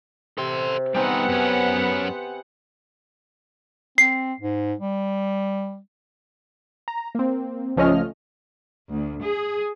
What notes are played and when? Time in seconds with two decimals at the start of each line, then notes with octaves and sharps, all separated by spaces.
0.38 C3 A4 C6
0.95 G3 B3 C4 D#4 G#4 C5 F#5
1.29 F#2 C#4
3.98 C4 C7
4.41 G#2
4.79 G3
6.88 A#5
7.15 A#3 C4
7.77 C#2 F3 A3 C#4 D#5 F6
8.89 D2
9.21 G#4